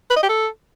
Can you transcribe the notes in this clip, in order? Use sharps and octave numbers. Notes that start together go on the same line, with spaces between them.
B4
D#5
G4
A4